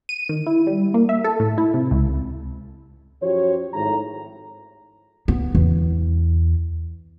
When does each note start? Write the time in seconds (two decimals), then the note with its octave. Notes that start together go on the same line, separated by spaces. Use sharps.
0.09 D#7
0.29 D#3
0.47 E4
0.67 G3
0.94 A#3
1.09 E5
1.24 A4
1.40 A2
1.58 E4
1.74 C3
1.91 C#2
3.23 F#2 F3 F#4 G4 C5 C#5
3.74 G#1 A2 A#5
5.28 B3
5.55 E2